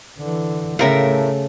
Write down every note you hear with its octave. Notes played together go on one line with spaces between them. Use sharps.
D3 E3
A2 C#3 A3 A#4 E5 F5